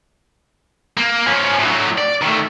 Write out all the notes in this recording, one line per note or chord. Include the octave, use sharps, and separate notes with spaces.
A#3
F3 C#4
A2 F#3
D5
D#3 A3